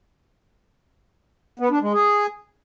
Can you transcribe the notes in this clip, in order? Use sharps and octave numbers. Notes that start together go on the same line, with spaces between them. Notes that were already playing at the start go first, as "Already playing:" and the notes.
B3
D4
G#3
G#4